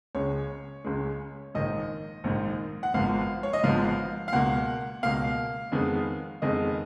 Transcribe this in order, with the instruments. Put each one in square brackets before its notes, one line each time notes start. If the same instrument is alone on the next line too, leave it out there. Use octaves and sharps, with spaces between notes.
[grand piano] C#2 C#3 G#3 C#5
C#2 C#3 G#3
A#1 G#2 D#3 D#5
A#1 G#2 D#3
F#5
G#1 G#2 F3 B3 F5
C#5
D#5
G#1 G#2 F3 B3 F5
F5
C#2 B2 A#3 F#5
C#2 B2 A#3 F5
F2 D#3 G#3 B3
F2 D#3 G#3 B3 D#5